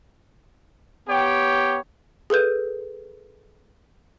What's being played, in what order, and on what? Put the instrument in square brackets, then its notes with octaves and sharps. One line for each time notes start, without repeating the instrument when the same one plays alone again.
[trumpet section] B3 G4 C#5 G5
[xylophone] G#4 A4 B4 G6